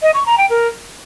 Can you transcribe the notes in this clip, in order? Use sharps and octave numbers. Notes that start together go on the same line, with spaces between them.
D#5
C#6
A#5
G5
A#4